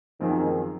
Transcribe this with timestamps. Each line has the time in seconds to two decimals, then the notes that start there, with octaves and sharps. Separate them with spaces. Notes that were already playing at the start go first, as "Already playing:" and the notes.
0.20 F#2 D#3 F3 C4 F4 G#4